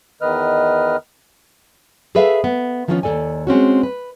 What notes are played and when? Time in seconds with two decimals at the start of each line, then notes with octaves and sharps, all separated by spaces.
0.22 E2 D#3 B4 D#5 F6
2.15 G#4 A4 B4 E5 F5
2.44 B3
2.88 D#3 F3 B3 C#4 D#4 F4
3.03 D#2 F3 A4 D5 G#5
3.47 G#3 C4 C#4 F#4
3.83 B4